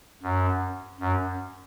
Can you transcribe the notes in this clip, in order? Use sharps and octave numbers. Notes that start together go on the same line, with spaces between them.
F#2
F#2